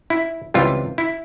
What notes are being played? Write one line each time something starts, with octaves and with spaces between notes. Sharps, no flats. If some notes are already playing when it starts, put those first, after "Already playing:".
E4
C#2 C3 E3 G3 F4
E4